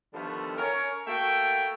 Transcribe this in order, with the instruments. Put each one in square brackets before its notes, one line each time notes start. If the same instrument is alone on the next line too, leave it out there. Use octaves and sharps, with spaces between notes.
[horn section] D3 D#3 F3 G3 A3 B3
C#4 A#4 C#5
A3 A#3 F#4 E5 G5